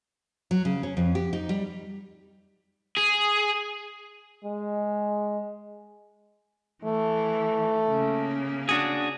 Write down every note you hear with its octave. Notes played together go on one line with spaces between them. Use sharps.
F#3
C#3
C#4
F2
G4
D#4
G3
G#4
G#3
E3 A3
C#3 A#3
D4 F#4 G#4